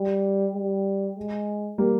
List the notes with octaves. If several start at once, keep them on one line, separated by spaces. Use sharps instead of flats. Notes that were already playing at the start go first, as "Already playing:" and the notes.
Already playing: G3
G3
G#3
G3 A#3